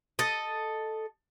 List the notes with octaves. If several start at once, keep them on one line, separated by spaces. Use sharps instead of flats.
A4 D#5